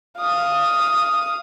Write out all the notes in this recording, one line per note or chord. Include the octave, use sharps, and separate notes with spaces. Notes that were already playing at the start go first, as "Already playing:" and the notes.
F5 D#6